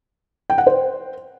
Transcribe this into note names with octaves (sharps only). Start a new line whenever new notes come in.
G5
F#5
C5